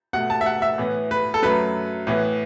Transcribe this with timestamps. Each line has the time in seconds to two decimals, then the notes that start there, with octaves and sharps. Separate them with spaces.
0.13 B2 A3 F#5
0.30 A5
0.41 E5
0.46 F#5
0.62 E5
0.78 A2 E3 B3
1.11 B4
1.34 A4
1.42 F#2 F#3 A3 B4
2.07 A2 E3 B3